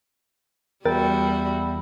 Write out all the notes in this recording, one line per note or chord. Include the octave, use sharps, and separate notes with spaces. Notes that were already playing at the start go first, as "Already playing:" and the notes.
E2 G3 E4 F#4 A#4 G5 A6